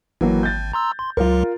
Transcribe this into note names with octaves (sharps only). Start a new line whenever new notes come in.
G#1 E3 F#3 A#3
G6 A6
A#5 C6 E6
C6
C#2 F#3 F4 A#4